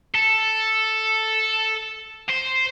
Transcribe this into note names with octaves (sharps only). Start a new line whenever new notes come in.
A4
C5